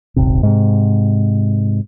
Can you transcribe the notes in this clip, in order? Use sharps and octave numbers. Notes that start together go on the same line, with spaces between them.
D#1 G#1 C3
G#2 C3